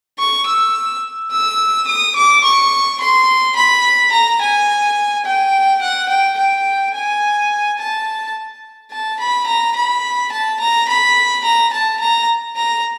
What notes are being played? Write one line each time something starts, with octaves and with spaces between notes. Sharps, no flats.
C#6
E6
E6
D#6
D6
C#6
C6
B5
A#5
G#5
G5
F#5
G5
G5
G#5
A5
A5
B5
A#5
B5
A5
A#5
B5
A#5
A5
A#5
A#5